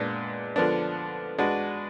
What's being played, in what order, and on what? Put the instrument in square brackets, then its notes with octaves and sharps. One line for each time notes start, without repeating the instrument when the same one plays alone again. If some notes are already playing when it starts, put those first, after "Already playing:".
Already playing: [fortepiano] A#2 G#3 B3 D4
D3 F3 B3 D4
G#3 D4 F#4 B4